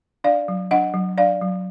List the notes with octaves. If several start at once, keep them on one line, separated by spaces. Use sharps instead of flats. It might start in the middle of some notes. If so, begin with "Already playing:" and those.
D4 D5 F5
F#3
D4 D#5 F#5
F#3
D4 D5 F5
F#3